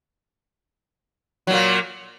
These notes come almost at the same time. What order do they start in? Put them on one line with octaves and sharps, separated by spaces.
F#3 A#2 A#3